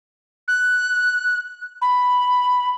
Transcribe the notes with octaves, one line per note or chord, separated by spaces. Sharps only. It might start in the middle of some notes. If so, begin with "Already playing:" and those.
F#6
B5